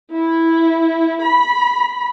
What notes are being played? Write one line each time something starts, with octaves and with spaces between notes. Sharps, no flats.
E4
B5